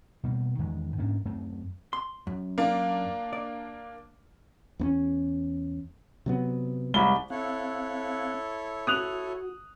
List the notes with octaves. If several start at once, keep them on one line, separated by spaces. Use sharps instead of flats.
B2 G3 A#3
E2 D#3 G#3
G#2 A#3 C#4 D4
F#2 A3 C4
C6
F#2
A#3 D4
D5
E2 B3 C#4
C3 F#3 B3
C2 G#3 B5 G7
C4 E4 A4 C#5 F5 F#6
F#4 D#6 F#6 F7